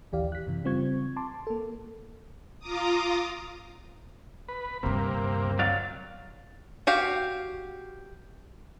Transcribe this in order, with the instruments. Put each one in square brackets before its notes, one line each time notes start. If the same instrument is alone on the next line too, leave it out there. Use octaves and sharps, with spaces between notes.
[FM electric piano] A#1 D#2 E3 G4 D5 F5
F#6 B6
F#2 C3 E3
C#3 G3 C4 F4 C#6 G#6
A5 C6 D6
A#3 A4
[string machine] F4 A#5 D6 D#6
[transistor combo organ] B4
[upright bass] D2 G2 [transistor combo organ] C3 A#3
[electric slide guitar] F#3 D5 F5
[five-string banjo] F#4 G4 F5